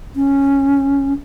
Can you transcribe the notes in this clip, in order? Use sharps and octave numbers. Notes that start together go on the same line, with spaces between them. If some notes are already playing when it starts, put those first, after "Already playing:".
C#4